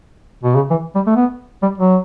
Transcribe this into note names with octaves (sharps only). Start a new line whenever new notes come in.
B2
C#3
E3
G3
A3
B3
G3
F#3